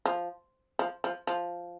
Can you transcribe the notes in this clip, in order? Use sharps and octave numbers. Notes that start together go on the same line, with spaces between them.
F3
F3
F3
F3